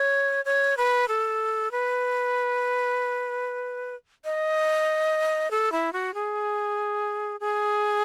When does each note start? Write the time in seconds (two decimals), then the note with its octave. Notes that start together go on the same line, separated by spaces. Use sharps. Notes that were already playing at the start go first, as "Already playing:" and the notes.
Already playing: C#5
0.45 C#5
0.77 B4
1.08 A4
1.71 B4
4.25 D#5
5.51 A4
5.72 E4
5.93 F#4
6.14 G#4
7.40 G#4